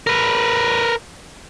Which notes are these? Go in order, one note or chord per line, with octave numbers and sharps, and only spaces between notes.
A#4 B4